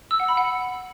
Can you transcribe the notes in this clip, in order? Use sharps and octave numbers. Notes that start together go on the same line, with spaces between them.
E6
F#5
B5
F#5